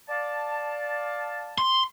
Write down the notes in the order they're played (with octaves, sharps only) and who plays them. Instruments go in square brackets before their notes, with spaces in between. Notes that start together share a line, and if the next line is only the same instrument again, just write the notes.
[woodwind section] D5 F5 A5
[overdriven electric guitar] C6